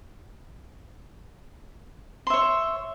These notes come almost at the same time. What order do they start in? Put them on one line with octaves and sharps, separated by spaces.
C6 E5 C#5